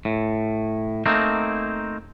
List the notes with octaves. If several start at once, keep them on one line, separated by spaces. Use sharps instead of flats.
A2
A3 A#3 C4 D#4